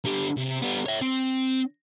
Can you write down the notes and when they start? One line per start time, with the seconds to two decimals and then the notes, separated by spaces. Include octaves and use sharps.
0.05 D3 G4
0.37 C3
0.62 G3 B3
0.86 C#5 E5
1.02 C4